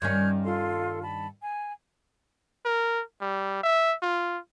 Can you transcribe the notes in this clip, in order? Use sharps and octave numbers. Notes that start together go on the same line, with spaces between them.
G2 D#3 C#4 F6 G6 G#6
F4 A4 C6
A5 B5
G#5
A#4
G3
E5
F4